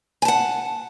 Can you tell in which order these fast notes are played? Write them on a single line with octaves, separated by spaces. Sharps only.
G#5 A5 F#5